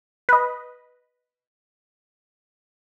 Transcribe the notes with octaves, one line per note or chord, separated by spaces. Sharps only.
B4 D#5